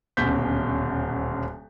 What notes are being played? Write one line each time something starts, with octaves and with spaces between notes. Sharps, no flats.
D#1 D2 B2 C#4 G6 B6